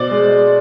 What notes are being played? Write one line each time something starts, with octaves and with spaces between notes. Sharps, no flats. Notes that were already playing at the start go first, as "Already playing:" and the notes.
Already playing: B2 C5 D5
G#3